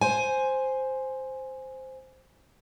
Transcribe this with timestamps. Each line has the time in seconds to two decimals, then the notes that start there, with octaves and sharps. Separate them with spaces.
0.01 C5 G#5